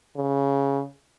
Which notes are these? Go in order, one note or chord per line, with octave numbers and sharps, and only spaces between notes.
C#3